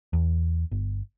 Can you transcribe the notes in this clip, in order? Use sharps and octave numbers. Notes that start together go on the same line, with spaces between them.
E2
G1